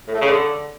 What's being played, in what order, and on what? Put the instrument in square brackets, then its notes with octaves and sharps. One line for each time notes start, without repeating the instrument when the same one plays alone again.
[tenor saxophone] A2
A3
C#3
D3